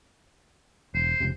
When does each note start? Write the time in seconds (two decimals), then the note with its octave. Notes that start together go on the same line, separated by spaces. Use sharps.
0.95 E1 C5
1.20 F1 C#2 C3